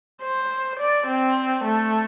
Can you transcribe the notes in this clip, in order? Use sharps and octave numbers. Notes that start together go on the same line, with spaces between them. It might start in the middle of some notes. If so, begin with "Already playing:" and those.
C5
D5
C4
A3